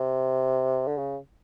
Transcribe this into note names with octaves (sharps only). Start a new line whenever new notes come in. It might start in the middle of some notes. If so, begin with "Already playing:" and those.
Already playing: C3
D3
C#3